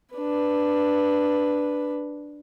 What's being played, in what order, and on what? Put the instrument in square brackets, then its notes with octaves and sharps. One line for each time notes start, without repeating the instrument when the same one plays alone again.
[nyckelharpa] D4 B4